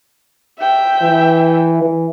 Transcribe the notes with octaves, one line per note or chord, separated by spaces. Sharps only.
E5 G5
E3
E3